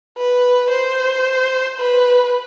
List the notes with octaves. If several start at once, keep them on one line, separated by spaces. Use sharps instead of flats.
B4
C5
B4